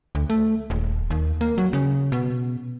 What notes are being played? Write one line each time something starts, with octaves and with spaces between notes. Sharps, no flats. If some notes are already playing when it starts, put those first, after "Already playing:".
D2
A3
D#1
D#2
A#3
F#3
C#3
B2